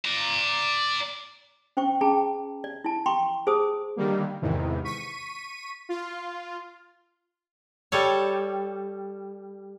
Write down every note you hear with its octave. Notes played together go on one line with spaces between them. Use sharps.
D5 A#5
C#4 C5 G5 C#6
C#4 G#4 G5 A5 A#5
D5
E4 A5
G5 A#5 C6 C#6
G#4 C5 A5 D#6
D3 D#3 G3 A#3
E2 G#2 C3 D#3 E3
C#6 B6 D#7
F4
G3 A4 C#5